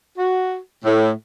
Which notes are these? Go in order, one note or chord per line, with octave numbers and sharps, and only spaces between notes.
F#4
A2